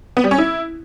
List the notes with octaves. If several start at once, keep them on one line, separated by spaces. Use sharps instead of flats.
B3
G3
C#4
E4